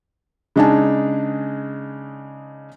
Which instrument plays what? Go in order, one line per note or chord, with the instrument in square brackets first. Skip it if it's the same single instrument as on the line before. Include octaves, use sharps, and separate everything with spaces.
[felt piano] C#3 G#3 D4 D#4 G#5 A5